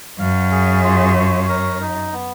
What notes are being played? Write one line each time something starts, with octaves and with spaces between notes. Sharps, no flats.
F#2 F5
G#4
F4
C#5
A#4
D#4
B3